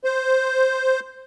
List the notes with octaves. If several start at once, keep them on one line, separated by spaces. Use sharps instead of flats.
C5